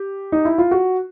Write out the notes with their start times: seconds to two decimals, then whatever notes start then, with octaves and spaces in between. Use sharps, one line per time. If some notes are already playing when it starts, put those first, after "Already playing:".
Already playing: G4
0.32 D#4
0.45 E4
0.58 F4
0.71 F#4